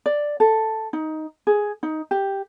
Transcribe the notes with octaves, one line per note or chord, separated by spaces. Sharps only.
D5
A4
D#4
G#4
D#4
G4